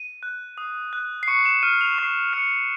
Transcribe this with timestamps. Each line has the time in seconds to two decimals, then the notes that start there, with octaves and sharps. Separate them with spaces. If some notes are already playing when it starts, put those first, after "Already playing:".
Already playing: D#7
0.23 F#6
0.58 D#6
0.93 F#6
1.23 C7
1.27 C#6 C#7
1.45 E7
1.63 F6 D#7
1.81 F7
1.98 C#6 C7
2.33 F6 C#7